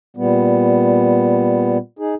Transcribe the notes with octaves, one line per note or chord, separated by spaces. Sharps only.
A#2 G3 B3
D#4 G#4